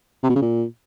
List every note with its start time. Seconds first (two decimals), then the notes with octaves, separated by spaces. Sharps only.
0.23 C3
0.29 B2
0.35 C#3
0.42 A#2